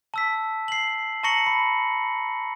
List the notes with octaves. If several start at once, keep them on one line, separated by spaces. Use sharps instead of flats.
A5 E6 B6
C7 F#7
A5 A#5 C#6 A#6 C#7 F#7
B5